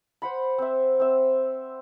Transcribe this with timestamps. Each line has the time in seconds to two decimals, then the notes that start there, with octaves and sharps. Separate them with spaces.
0.22 C5 F#5 B5
0.58 C4 E5
1.00 C4 E5